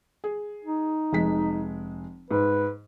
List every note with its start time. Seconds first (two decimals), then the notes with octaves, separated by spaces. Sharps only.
0.24 G#4
0.65 D#4
1.13 F1 G#3 B6
2.31 G#2 B4